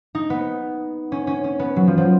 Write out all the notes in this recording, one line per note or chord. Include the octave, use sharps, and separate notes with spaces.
D#4
B3
C#4
C#4
C#4
B3
F#3
F3
F3